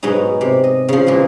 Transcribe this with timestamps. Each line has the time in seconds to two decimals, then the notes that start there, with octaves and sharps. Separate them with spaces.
0.03 G#2 B2 F#3 G#3 D#4
0.41 C3
0.64 D#5
0.89 C#3 F3
1.06 A#2 E3 G#3 A#3